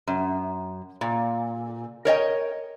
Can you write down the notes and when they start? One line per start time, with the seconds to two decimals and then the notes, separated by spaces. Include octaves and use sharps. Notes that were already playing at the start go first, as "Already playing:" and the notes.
0.07 F#2
1.01 A#2
2.05 A#4 C#5 D#5 G5